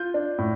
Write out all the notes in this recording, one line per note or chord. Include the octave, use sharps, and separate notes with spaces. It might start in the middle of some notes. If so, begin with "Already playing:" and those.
Already playing: F4 G6
D4
A2